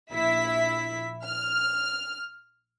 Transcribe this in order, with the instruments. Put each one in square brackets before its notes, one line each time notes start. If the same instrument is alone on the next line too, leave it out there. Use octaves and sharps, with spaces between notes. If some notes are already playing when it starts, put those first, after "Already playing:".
[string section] A#1 E4 E5 B6
F6